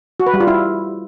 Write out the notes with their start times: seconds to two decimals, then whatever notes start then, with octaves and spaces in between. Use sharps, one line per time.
0.20 F#4
0.27 B4
0.34 G3
0.40 F4
0.47 E4